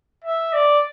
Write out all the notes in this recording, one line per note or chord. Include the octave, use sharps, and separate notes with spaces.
E5
D5